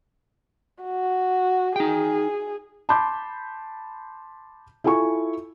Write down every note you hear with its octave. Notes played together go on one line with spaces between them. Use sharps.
F#4
D#4 G#4 G5
A5 B5 C6 D6 G6
E4 F4 A4 G#5 C#6